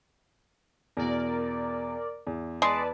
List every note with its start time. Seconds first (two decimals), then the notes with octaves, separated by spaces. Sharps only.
0.97 E2 B2 A#4 D5
2.27 E2
2.62 G#3 B4 D5 A5